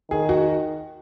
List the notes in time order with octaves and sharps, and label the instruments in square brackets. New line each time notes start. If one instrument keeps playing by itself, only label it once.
[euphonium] D#3 [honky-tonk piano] G#4
[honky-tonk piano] F#4